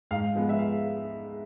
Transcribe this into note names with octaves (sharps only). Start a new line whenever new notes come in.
G#2 F5
F3 G#3 B3
E5
F5